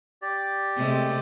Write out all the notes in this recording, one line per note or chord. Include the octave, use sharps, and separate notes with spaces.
G4 D5
C3 G#3 A3